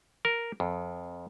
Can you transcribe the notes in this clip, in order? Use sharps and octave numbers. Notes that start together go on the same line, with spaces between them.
A#4
F2